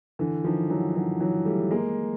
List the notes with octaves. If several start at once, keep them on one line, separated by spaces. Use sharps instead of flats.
D3 E3
D#3 F3
E3 F#3
E3 F#3
E3 F#3
G3 A3
G#3 A#3